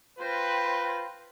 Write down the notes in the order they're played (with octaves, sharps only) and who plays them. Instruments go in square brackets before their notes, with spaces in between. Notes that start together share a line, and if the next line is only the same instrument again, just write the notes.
[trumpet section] F4 B4 [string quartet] C5 G5 A#6